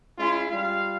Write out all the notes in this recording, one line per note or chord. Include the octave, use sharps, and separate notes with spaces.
G#3 C#4 E4 F4
G3 F4 F5